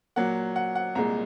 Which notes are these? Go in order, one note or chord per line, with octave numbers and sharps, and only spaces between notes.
A#2 F#3 A#3 F#5
F#5
F#5
C2 A#2 G#3 A#5